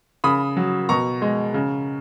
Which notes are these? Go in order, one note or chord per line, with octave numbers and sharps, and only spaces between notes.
C#3 B5 D#6
F#3
B2 A#5 C#6
G#3
C#3